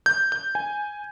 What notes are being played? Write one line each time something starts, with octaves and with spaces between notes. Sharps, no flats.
G6
G6
G#5